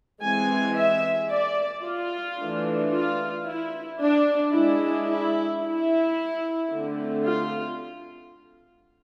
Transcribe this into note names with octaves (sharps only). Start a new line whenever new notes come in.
E3 G#3 C4 G#5
E5
D5
F4
E3 A3 D4
F4
E4
D4
G#3 D4 E4
E4
E4
D3 A3 C4
F4